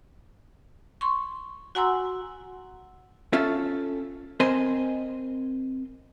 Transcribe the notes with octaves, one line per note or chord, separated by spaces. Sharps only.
C6 C#6
F#4 F#5 G#5 A#5 C6 E6
C#4 F4 A4 E5
C4 A#4 C5 D#5 G#5 C6